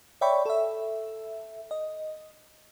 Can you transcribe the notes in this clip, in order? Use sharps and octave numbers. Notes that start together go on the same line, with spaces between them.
C#5 D5 E5 G5 B5 C#6
A4 E5
D#5